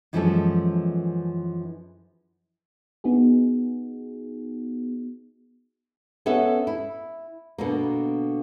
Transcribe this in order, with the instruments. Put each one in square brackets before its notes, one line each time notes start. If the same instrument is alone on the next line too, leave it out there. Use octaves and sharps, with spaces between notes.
[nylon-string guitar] F#2 E3 F3 G#3 C#4 A4
[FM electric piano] B3 D#4 F#4 G#4
[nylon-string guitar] B3 C#4 A4 E5 F#5
E4
B2 D3 A#3